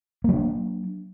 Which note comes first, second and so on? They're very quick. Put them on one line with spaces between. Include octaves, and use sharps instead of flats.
A#3 F#3 D4